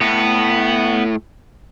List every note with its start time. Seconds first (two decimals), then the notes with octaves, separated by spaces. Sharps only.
0.01 A2 B3